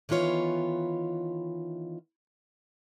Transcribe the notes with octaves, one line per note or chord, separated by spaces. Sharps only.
D#3 E3 B3 F4 C#5